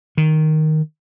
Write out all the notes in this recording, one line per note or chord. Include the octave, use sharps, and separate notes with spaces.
D#3